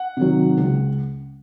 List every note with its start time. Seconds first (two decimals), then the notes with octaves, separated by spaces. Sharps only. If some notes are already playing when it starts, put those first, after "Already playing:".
Already playing: F#5
0.17 C3 D#3 F#3
0.57 C#2